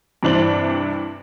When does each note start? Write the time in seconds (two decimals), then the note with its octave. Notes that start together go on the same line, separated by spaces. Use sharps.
0.23 G2 C3 E3 D4 C5 F#7